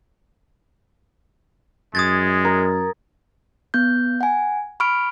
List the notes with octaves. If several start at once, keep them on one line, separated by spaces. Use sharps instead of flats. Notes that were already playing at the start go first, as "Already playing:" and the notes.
F#2 G#3 D#6 G#6 A6
A#4
B3 G6
F#5 G#5
B5 C#6 F6 D7